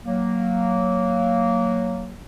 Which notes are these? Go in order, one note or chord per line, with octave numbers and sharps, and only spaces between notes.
F#3 A#3